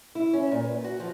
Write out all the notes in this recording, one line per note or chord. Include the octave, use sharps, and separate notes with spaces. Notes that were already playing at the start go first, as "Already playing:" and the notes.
E4
C#4
A#2
B4
F#4
F3